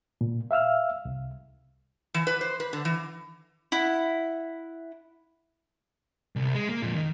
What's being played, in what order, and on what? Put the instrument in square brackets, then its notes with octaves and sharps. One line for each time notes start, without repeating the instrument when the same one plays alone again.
[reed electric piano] A#2
E5 F5 E6 F6
C2
[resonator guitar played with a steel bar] E3
B4
C5
B4
D3
E3
[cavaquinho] E4 F#5
[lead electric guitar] C2
G#3
A#3
F2 A#2
D#3